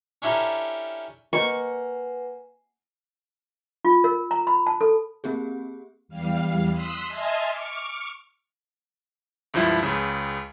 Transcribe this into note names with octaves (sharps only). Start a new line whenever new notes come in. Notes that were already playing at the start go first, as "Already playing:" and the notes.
C#4 D4 E4 G4 A4 A#4
A#3 B4 C5 D#5 F#5 G#5 C#6
F4
A#4
A#5
B5
A5
A4
A#3 C4 G4 G#4
E2 G3 F5
C6 D#6 E6 F#6 B6
D#5 E5 G#5 A5 C6 F6
C#6 D6 F6
C#2 G2 F3 E4
C#2 C#3